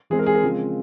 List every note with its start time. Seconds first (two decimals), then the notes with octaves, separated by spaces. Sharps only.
0.10 E3 G#3 C4 G#4
0.19 A#4
0.26 G#4
0.35 A#4
0.43 C#3 F3 G#3 C4